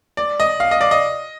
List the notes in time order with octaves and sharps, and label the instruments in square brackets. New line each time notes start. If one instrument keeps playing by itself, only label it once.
[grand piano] D5
D#5
F5
D#5
D5
D#5